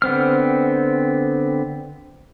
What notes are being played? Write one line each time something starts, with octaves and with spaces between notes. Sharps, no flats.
D3 B3 C4 F6